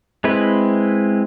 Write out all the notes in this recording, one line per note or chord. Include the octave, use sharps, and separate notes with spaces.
G#3 C4 E4 B4